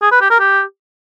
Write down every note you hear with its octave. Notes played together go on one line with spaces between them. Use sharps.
G#4
B4
G4
A#4
G4